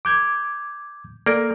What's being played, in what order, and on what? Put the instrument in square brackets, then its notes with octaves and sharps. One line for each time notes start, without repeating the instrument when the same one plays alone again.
[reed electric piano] D6 G6 G#6
[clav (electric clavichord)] A#3 [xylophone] A4 D5 D7